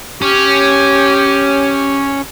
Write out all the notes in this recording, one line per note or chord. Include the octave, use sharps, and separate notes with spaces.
C#4 G4